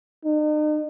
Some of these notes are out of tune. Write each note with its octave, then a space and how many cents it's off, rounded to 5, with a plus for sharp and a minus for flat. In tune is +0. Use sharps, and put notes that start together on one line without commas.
D#4 -40